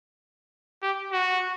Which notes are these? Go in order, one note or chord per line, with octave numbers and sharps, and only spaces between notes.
G4
F#4